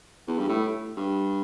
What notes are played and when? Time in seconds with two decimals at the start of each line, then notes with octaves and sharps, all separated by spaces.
0.27 E2
0.38 G2
0.48 A2
0.97 G2